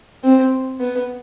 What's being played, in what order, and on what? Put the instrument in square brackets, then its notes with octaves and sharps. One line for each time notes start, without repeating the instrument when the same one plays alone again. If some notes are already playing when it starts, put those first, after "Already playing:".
[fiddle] C4
B3